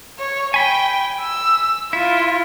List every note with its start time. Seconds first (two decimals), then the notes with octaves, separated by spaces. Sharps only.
0.19 C#5
0.54 G5 G#5 B5
1.21 E6
1.93 E4 F4